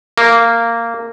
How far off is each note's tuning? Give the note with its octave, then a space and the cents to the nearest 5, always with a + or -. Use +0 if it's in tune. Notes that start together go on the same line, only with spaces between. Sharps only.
A#3 -15